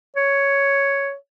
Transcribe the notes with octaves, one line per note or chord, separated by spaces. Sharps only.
C#5